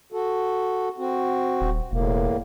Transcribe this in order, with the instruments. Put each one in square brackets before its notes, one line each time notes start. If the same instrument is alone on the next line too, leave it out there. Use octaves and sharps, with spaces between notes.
[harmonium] F#4 A4
C4 F#4
[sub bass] D#1
[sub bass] E1 [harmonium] E2 A2 A#3